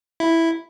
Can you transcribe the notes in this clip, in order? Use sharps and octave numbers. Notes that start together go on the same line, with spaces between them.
E4